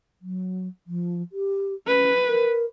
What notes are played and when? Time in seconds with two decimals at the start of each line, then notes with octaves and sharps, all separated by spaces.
0.21 F#3
0.87 F3
1.32 G4
1.87 C#4 B4
2.28 A#4